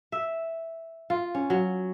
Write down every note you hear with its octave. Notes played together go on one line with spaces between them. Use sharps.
E5
F4
C#4
F#3